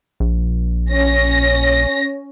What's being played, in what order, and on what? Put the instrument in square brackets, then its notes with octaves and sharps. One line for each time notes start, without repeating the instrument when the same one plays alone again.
[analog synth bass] A#1
[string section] C#4 A#6